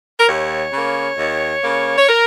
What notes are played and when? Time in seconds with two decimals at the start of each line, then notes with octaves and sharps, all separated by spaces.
0.20 A#4
0.27 D#2 C#5
0.72 C#3 A#3
1.18 D#2
1.63 C#3 A#3
1.98 C#5
2.09 A#4